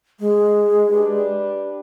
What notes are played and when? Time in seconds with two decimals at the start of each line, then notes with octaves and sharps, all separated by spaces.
0.20 G#3
0.90 D4 G4 B4